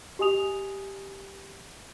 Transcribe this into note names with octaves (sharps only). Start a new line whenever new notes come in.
G4 D#5 G#5 D#6 F7